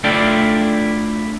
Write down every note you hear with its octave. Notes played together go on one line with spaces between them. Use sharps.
A3 D4 E4 F4 D5 G5